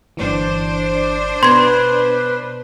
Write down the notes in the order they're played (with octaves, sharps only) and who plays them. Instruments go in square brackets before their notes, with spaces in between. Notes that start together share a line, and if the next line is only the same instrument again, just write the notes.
[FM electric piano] G1 E3 [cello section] D4 C5
[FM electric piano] B2 B3 [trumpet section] B4 [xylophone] C6 G#6